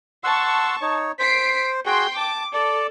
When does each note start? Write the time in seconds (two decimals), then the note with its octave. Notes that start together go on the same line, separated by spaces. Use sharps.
0.24 F#5 A5 C6 C#6 E6
0.81 D#4 C#5
1.19 C5 B6 C7 D7
1.86 F#4 G#4 G5 C6
2.17 A5 D6
2.53 A4 D5